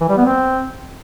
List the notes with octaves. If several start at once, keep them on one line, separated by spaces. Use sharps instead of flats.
E3
G3
B3
C4